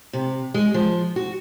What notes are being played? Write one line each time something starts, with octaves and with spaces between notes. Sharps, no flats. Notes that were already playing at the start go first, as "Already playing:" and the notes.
C3
G#3
F3
F#4